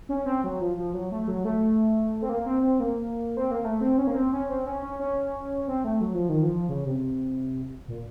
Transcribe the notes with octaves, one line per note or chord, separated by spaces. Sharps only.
C#4
C4
F#3
F3
F3
F#3
A3
F#3
A3
C4
A#3
C4
C4
A#3
C4
A#3
A3
C4
C#4
A#3
C4
C#4
C4
C#4
C#4
C#4
C4
A3
F#3
F3
D#3
F3
C#3
C3
A#2